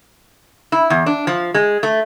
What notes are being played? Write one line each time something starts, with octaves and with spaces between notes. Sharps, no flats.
E4
E2
D4
F3
G#3
A3